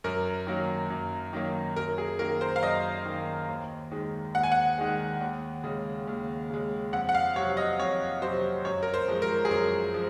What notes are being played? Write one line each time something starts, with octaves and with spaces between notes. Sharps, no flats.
F#2 A#4
D#3 F#3 A#3
F#2
D#3 F#3 A#3
F#2 A#4
G#4
D#3 A#3 A#4
C5
F5
F#2 D#5
D#3 A#3
D#2
D#3 G#3
D#2 F#5
G#5
F#5
D#3 G#3
D#2
C#3 G#3
D#2
C#3 G#3
F2 F#5
F#5
F5
C3 F#3 C#5
D#5
F2 C#5
C3 F#3 C5
F#2 C#5
A#4
C5
F3 G#3
A#4
G#4
F#2 A#4
F3 G#3